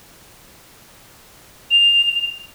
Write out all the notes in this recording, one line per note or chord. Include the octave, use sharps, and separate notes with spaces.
F7